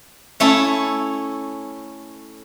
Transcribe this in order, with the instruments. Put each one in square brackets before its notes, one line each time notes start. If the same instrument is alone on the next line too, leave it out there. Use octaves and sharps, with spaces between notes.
[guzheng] A3 C#4 E4 A4